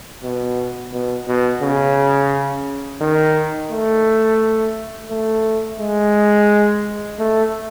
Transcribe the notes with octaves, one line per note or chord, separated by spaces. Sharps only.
B2
B2
B2
C#3
D#3
A3
A3
G#3
A3